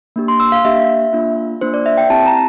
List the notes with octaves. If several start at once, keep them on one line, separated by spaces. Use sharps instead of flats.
A#3 D4 G4
C6
E6
F5
A#3 D4 G4 E5
A#3 D4 F4
A#3 D4 F4 C5
D5
E5
G5
C4 E4 G4 A5
A#5